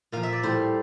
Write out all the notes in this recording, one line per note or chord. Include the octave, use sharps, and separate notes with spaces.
A#2 F3 F5
E5
D5
A2 G3 C5